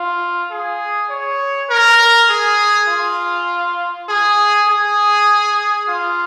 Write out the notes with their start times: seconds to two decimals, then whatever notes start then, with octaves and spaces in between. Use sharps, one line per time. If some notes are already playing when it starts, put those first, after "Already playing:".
Already playing: F4
0.51 G#4
1.10 C#5
1.70 A#4
2.29 G#4
2.89 F4
4.09 G#4
4.68 G#4
5.88 F4